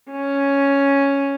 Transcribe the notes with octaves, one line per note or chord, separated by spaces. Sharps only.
C#4